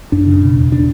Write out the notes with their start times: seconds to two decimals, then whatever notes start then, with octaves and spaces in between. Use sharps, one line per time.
0.12 F#2 D4
0.27 C#3
0.42 B2
0.56 E2
0.72 D4